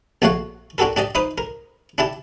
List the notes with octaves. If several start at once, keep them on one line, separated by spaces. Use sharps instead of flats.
A#1 A3 F#4 C#5 F5 F#5
D4 F#4 G4 A4 A#4
D4 G4 D5 D#5
D#4 B4 C5 D#6
A#4
D4 E4 G4 A5